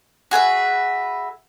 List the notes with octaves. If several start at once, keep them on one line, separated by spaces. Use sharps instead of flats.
F#4 G#4 B4 E5